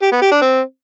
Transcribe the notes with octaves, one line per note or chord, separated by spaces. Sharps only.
G4
B3
G4
D4
C4